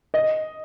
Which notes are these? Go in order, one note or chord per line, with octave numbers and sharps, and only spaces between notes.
D#5